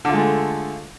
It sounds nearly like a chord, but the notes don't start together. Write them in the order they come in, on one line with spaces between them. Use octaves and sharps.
D3 F4 G#3 A3